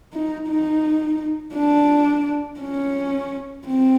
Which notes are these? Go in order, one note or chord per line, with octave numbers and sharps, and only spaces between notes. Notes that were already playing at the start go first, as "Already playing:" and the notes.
D#4
D#4
D4
C#4
C4